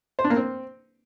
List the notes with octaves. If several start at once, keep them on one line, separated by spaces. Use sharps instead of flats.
C5
D4
A#3
C4